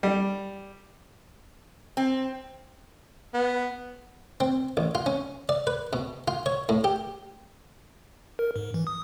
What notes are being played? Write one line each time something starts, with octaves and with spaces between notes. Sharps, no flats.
G3
C4
B3
C4
A1
F4
C#4
D5
B4
B2
F4
C#5
A2
G4
A#4
G#2
E3
D#6